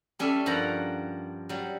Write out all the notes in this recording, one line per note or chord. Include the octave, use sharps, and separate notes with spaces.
G3 C#4 A4 D5 E5
G2 F3 A#4 F#5 A#5
F#3 G3